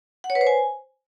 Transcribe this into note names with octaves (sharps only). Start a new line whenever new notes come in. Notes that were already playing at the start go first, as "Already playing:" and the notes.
F#5
C#5
B4
C5
G#5